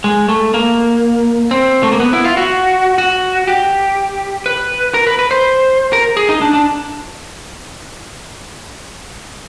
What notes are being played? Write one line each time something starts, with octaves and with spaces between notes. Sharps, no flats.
G#3
A3
A#3
C4
A3
A#3
B3
E4
F4
F#4
F#4
G4
B4
A#4
B4
B4
C5
A#4
G#4
D#4
D4
D4